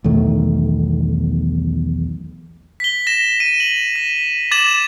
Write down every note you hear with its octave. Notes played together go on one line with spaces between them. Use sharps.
B1 E2 D#3 A3
B6 G7
A#6 E7
D#7 E7
F#7
B6
D6 A6 E7 F#7